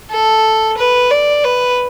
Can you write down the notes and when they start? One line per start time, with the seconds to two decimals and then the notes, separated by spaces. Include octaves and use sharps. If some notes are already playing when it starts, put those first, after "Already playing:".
0.11 A4
0.77 B4
1.11 D5
1.44 B4